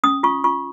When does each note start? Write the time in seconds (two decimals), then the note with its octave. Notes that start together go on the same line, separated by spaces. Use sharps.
0.04 C#4 D#6
0.23 F4 C#6
0.44 F4 C#6